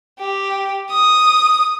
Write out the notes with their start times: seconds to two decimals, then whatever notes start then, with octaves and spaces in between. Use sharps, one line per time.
0.19 G4
0.91 D#6